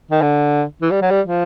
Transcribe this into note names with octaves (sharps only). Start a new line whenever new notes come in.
D#3
D3
E3
G3
F#3
G3
F3